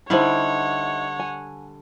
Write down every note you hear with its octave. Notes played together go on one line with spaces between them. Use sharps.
D3 G3 D#4 E4 C5 C#5 F#5
G#5